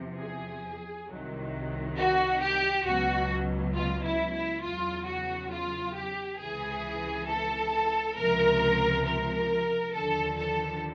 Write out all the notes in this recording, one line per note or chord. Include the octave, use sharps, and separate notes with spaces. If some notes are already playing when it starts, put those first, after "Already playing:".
Already playing: E2 C3 F3
G#4
C2 C3 D#3 F#3
F#4
G4
C#2 B2 F#3 F#4
F4
E4
E4
E2 C#3 F#3 F4
F#4
F4
G4
C#2 C3 E3 G#4
A4
C#2 C3 F3 A#4
A#4
D#2 D3 F3 A4
A4